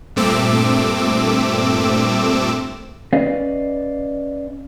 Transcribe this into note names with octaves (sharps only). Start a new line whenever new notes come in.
G2 A#2 A3 C4 D6 E6
C#4 B4 D5 D#5 F5